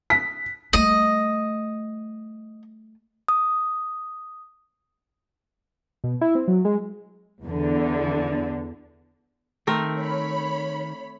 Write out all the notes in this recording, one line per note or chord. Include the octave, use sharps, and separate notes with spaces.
B6
G3 A3 D#5
D#6
B2
E4
C4
F#3
G#3
E2 D3
D#3 A3 C4 A#4
C#5 B5